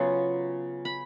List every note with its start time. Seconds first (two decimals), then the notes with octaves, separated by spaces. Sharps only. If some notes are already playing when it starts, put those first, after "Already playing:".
Already playing: C#3 F#3 B3 F4
0.85 B5